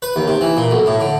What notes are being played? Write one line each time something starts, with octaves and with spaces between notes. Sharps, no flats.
B4
D#2
C3
E3
A#2
B1
A2
D3